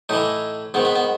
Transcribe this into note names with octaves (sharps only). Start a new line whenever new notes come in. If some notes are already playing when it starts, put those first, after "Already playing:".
A2 E3 D#4
G#2 D#3 B3
B3
B3